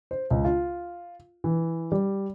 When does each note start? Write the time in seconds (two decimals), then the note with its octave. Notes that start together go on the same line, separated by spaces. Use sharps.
0.11 C5
0.31 C#2
0.45 F4
1.44 E3
1.92 G3